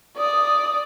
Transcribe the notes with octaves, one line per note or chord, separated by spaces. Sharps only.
D5 D#6